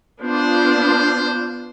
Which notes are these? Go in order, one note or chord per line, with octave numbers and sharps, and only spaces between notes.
B3 D4 F4 C5